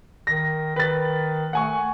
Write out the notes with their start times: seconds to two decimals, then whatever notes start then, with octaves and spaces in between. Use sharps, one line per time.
0.27 D#3 A#6
0.76 D#3 B4 A6
1.53 A3 F#5 G#5 C#6